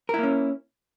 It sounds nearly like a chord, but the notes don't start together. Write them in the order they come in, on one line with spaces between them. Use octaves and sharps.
A#4 E4 A#3 C#4